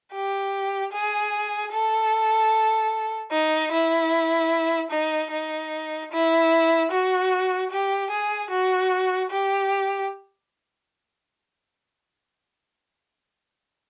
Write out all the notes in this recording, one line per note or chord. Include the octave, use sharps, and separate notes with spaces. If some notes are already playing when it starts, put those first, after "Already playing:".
G4
G#4
A4
D#4
E4
D#4
D#4
E4
F#4
G4
G#4
F#4
G4